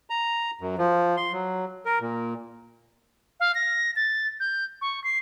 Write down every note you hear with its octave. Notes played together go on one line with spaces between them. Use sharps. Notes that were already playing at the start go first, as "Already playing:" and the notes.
A#5
F#2
F3
C6
F#3
A#4
A#2
F5
A#6
A6
G6
C#6
C7